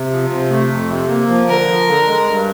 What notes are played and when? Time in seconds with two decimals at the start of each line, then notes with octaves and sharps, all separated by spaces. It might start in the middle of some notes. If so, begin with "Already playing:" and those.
Already playing: C3
0.11 F3
0.30 C3
0.50 A3
0.69 F2
0.89 C3
1.08 A#3
1.28 F3
1.48 D3 A#4
1.68 F3
1.87 D3
2.07 G#3
2.27 G2